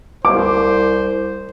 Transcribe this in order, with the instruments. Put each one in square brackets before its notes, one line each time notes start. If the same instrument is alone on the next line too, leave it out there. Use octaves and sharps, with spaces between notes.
[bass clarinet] C2 [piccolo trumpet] C5 [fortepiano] D6